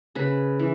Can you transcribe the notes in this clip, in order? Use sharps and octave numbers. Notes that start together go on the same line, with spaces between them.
C#3 B4
E3